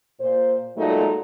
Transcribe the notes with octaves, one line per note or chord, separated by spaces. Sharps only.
A#2 C5
A#2 F#3 G#3 A3 D#4 A4